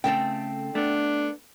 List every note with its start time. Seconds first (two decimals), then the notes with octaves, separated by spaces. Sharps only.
0.04 C#3 A3 C4 A4 G5
0.75 A3 B3 D4